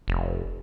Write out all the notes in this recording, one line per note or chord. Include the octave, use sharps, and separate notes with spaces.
F1